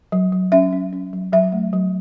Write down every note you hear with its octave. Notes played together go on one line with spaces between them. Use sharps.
F#3
F#3
C#4 E5
C#4
C#4
F#3
F#3 E5
A3
F#3